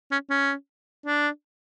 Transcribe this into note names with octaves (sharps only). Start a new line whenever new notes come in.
C#4
C#4
D4